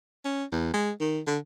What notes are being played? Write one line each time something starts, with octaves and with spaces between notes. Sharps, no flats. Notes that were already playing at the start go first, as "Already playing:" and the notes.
C#4
E2
G#3
D#3
D3